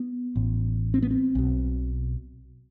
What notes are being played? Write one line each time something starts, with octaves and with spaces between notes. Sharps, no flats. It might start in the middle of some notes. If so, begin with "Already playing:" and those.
Already playing: B3
A1 A2
C4
B3
C4
B1 B2